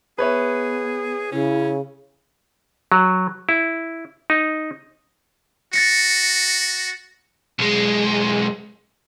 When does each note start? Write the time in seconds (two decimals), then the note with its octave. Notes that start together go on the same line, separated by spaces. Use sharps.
0.18 B3 G#4 B4 C#5 E5
1.32 C#3 C#4 E4
2.92 F#3
3.49 E4
4.30 D#4
5.73 F#4 A6 A#6 C#7
7.59 B1 G#3